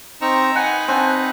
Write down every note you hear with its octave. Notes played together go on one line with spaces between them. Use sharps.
C4 D#4 A#5 C#6 E6
D#4 B4 F#5 G#5
C4 D4 G#5